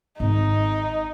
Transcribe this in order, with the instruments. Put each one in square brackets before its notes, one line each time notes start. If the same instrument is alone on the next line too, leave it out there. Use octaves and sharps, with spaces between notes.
[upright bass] G#1 [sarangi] D#4